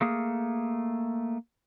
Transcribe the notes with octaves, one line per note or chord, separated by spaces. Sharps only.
A3 A#3 G#4